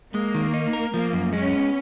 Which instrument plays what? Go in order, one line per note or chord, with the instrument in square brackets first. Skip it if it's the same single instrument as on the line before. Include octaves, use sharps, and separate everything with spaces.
[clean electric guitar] G#3 [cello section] A#3
[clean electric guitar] D#3
D#4
A#4
[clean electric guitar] F3 [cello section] A#3
[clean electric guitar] F#2
[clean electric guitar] G#3 [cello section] C#4
[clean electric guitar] B3